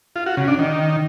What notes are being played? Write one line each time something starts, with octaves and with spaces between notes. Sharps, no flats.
F4
F#4
C#3
D4
D#3